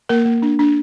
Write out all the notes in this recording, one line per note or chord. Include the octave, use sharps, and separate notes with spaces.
A#3 A#4
A#3
D4
D4